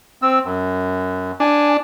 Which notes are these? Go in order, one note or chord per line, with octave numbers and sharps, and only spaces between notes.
C4 E6
F#2
D4 G#5